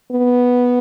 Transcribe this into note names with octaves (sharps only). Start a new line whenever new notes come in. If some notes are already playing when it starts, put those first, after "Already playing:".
B3